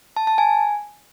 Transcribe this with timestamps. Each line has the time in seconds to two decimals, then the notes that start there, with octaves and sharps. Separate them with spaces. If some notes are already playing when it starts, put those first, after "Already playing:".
0.17 A5
0.27 A5
0.38 G#5